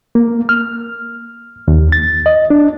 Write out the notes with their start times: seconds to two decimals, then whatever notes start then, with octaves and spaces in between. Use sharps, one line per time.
0.15 A#3
0.49 F6
1.68 D#2
1.92 A6
2.26 D#5
2.50 D4